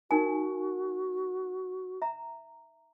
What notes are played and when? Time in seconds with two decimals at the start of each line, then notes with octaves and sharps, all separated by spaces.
0.11 D#4 F#4 A#4 G#5
2.02 E5 A#5